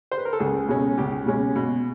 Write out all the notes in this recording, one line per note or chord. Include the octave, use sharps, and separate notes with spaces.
C5
B4
A#4
A4
C#2 G#4
B2 G#3 C#4
C#2 G4
B2 G#3 C#4
B2